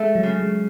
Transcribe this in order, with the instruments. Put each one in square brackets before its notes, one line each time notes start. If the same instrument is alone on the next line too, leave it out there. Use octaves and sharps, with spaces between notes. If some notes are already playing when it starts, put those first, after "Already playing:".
Already playing: [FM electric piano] G#3 [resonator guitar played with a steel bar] A3
[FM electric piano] F#3
[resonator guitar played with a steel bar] C#3
[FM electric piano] G#3